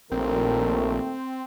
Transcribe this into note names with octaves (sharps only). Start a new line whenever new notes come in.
A#1 D#2 A#2 A3 C4 A#4